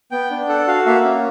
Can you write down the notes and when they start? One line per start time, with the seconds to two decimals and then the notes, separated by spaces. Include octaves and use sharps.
0.11 B3 G5
0.31 D4
0.48 A4 F#5
0.67 F#4 F5
0.86 A#3 E5
1.04 C#4